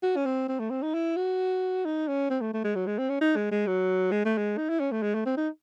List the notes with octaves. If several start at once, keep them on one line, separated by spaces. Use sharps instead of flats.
F#4
C#4
C4
C4
A3
C4
D#4
E4
F#4
D#4
C#4
C4
A3
A3
G#3
F#3
G#3
C4
C#4
D#4
G#3
G#3
F#3
G#3
A3
G#3
D#4
E4
C#4
A3
G#3
A3
C4
D#4